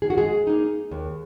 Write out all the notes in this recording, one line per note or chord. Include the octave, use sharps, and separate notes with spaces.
D#3 G#4
F#4
G#3 G#4
A#3 D#4
D#2